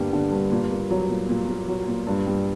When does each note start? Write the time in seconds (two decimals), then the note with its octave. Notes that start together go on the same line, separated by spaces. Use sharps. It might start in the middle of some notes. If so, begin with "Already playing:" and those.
Already playing: G2 D3 G3 A#3
0.13 D3
0.32 G2
0.51 A#2
0.70 A#3
0.90 F#3
1.10 A#2
1.29 A#2
1.48 A#3
1.68 F#3
1.87 A#2
2.07 G2
2.26 G3